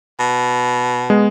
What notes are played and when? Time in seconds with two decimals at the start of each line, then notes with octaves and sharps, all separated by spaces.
0.20 B2
1.10 G#3 B3